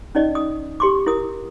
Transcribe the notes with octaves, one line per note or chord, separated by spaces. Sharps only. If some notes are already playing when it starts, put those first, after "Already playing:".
C#4 D#4 D5 D#5
D#6
G4 C6 D6
E4 A#4 D#6